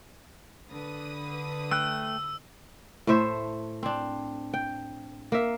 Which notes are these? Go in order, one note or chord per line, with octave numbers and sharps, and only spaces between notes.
D3 B4 D#6
A3 G5 E6 F#6
A2 A3 C5 E5
C4 D4
G5
A#3 E5